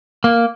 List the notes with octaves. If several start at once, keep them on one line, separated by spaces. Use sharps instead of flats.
A#3